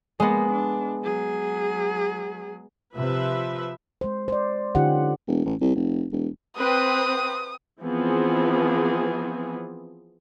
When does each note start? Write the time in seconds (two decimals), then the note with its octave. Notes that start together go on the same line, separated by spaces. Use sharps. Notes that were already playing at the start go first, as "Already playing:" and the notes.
0.20 G#3 A#3 B3
0.51 D4
1.04 F#3 G#4
2.94 C3 F3 B4 E5
4.01 G#3 C5
4.28 C5 D5
4.75 D3 C#4 D#4 F4 G4 F#5
5.27 E1
5.45 A1
5.61 C2
5.75 F1
6.12 E1
6.58 C4 B4 D#6
7.81 E3 F3 B3 C4 G#4